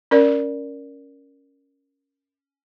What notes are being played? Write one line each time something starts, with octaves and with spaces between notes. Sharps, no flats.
C#4 A#4 D5